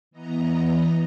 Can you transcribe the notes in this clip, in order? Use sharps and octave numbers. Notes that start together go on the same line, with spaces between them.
E3 B3 D#5 A#5